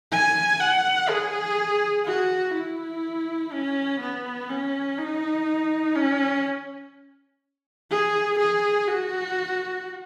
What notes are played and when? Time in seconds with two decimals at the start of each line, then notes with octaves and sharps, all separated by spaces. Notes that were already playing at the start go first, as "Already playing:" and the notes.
0.12 G#5
0.60 F#5
1.09 G#4
2.06 F#4
2.54 E4
3.52 C#4
4.00 B3
4.50 C#4
4.98 D#4
5.96 C#4
7.90 G#4
8.39 G#4
8.88 F#4